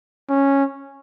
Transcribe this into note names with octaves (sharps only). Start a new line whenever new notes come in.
C#4